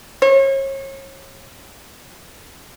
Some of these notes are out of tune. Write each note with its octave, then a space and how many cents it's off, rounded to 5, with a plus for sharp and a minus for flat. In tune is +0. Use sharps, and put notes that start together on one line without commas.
C#5 -35